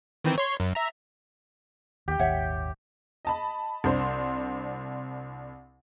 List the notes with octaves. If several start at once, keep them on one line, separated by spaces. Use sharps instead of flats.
D#3 E3 C4
C#5 C6
F#2
E5 A#5
D#2 G4 G5
D#1 G#1 D#2 C#5 E5 F#5
D#5 A5 B5
C2 D4 C5 C6